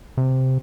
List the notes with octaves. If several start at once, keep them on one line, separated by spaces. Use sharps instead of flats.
C3